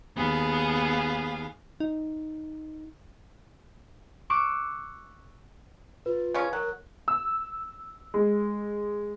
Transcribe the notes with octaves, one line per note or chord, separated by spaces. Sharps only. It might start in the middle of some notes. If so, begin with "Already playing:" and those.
D#2 B3 G#4 F5
D#4
C#6 D6 E6 F#6 C#7 D7
F4 B4
C#3 F3 C#4
F#3 A#4 F#6
E6
G#3